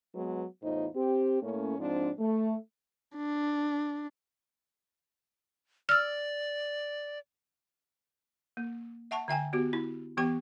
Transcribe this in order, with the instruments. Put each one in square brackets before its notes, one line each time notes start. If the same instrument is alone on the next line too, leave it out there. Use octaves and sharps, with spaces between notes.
[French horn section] F#3 G#3 B3
E2 A2 D#4 F4 C5
C4 G4
A2 A3 A#3 C#4
G#2 F3 C4 D4
A3
[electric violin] D4
[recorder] D5 [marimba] E6 F6
[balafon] A#3
E5 F#5 A5 C#6
D3 E5 G5 G#5
B3 F#4 G4
E4
E3 B3 G4 G5 C#6